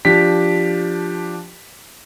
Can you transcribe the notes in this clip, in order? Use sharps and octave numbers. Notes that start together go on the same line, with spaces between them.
F3 D4 G4 B6